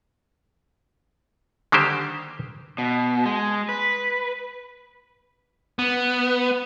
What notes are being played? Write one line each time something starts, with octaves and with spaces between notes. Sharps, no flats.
D3 D#3 G3 A#3 G4 C5
B2
G#3
B4
B3